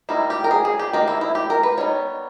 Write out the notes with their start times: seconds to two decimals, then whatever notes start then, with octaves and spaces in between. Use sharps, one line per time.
0.09 D#3 G3 A#3 D#4 E4
0.30 G4
0.44 A#4
0.51 G#4
0.65 G#4
0.79 G4
0.93 D#3 A#3 D#4 G4
1.08 E4
1.21 E4
1.35 G4
1.50 A#4
1.63 B4
1.77 G3 B3 D#4 C#5